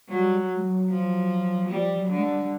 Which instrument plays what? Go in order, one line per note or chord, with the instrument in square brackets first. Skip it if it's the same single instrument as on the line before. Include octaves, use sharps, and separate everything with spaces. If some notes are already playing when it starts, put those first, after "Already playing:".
[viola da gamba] F#3 [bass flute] G3
[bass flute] G3
F#3
[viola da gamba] F3
[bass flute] F3 [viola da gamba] G3
[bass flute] F#3
[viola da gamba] D3
[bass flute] G#3
G3
G3